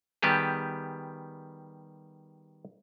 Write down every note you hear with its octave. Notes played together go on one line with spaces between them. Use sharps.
D#3 G3 B3 G4 G#4